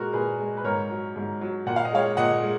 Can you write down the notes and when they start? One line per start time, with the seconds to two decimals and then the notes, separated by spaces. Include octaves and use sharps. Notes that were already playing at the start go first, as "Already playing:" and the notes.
Already playing: A#2 G#3 F#4 A#4
0.13 A#2 G#4 B4
0.40 G#3
0.57 B4
0.64 G#2 A#4 C#5
0.89 F#3
1.16 G#2
1.41 F#3
1.66 A#2 F#5
1.76 F5
1.85 D#5
1.92 G#3 C#5 F5
2.17 A#2 D#5 F#5
2.43 G#3